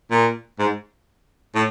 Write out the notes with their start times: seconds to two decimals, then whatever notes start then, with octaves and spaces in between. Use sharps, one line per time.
0.11 A#2
0.59 G#2
1.55 A2